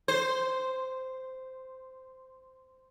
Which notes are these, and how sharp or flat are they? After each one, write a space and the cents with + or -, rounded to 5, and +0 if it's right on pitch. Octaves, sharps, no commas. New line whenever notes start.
C5 -10